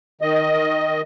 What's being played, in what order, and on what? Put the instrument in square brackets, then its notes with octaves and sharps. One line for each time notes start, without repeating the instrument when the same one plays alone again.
[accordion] D#3 D#5